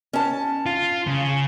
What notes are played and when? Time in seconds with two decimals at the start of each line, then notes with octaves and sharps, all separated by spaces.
0.13 C#4 A5
0.66 F4
1.07 C#3